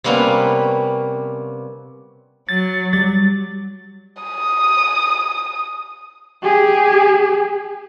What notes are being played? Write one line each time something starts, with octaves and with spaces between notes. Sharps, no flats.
C3 G3 A#3 B3 C#4
F#3 A6
G3 A6
D#6
G4 G#4